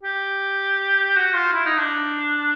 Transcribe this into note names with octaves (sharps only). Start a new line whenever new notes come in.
G4
F#4
F4
E4
D#4
D4